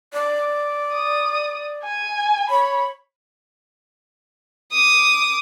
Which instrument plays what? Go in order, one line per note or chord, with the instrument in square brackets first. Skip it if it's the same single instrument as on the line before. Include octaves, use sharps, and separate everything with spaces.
[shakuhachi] D5
[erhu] D#6
G#5
[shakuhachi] C#5 [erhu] B5
[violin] D6 D#6